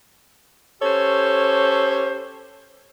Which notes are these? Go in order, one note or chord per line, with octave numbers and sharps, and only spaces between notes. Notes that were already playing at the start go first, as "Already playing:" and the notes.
C#4 G4 A4 C5 C#5